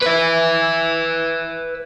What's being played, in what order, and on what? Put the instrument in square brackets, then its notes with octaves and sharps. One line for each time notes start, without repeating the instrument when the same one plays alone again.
[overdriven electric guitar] B4 E5